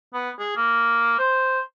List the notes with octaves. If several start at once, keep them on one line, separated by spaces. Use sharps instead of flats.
B3
G#4
A#3
C5